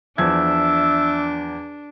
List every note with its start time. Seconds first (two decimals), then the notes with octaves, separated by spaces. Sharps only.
0.18 E2 F3 D4 E5 G#6